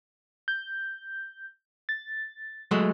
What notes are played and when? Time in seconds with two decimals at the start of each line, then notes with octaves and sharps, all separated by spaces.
0.48 G6
1.89 A6
2.71 F#3 G#3 A3